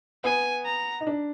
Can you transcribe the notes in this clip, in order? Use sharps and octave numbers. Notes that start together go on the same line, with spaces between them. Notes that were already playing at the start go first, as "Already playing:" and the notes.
B3 G#5
A#5
D#4
D4